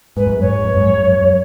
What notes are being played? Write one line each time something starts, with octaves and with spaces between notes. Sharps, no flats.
G#2 B4
F#2
G#2 C#5
F#2
G#2
F#2
F#2